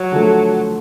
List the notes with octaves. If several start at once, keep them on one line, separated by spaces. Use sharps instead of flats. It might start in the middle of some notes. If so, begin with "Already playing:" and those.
Already playing: F#3
D3 F3 A3